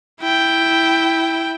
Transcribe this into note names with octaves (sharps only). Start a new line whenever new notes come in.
E4 G5